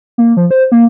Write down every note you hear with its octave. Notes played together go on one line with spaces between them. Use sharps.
A#3
F3
C5
A#3